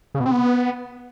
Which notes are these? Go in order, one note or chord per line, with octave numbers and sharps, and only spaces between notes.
C#3
B2
C4
B3